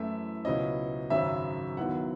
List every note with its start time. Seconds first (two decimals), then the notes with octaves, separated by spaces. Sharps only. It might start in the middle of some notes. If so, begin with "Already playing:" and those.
Already playing: F#2 E3 A3 E4 E5
0.45 C#2 B2 F#3 C#4 E4 D#5
1.10 G#1 F#2 C#3 F#3 C#4 E5
1.77 D#2 D#3 F#3 B3 E4 F#5